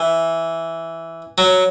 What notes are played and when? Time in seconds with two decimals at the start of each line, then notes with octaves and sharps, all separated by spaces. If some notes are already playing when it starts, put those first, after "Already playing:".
Already playing: E3
1.38 F#3